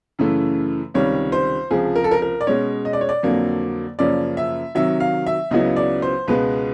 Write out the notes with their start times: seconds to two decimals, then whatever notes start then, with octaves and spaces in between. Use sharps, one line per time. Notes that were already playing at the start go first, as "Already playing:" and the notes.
0.19 F#2 C#3 E3 A3
0.94 C#2 C3 D#3 G3 C#5
1.32 C5
1.71 C#2 C3 F3 G#4
1.95 A#4
2.04 A4
2.11 A#4
2.22 A#4
2.41 D5
2.47 B2 G#3 C#4 C#5
2.85 D#5
2.93 D5
3.01 C#5
3.09 D5
3.23 F2 D3 F#3 A#3
3.99 F#2 C#3 F3 A#3 C#4 D5
4.37 E5
4.75 C3 D#3 F#3 E5
5.00 F5
5.26 E5
5.51 C#2 C#3 F#3 B3 E4 D#5
5.76 D5
6.02 C5
6.28 C#2 B2 G#3 B4